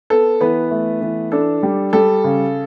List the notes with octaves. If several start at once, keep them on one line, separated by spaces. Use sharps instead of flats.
B3 A4
E3 B3 B4
A3
E3
D4 A4
G3
G3 A4
C#3